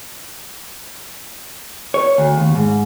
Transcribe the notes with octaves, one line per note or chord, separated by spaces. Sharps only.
C#5
D2
D#2
G#2